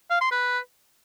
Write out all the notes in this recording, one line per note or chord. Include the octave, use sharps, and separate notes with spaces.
F5
C6
B4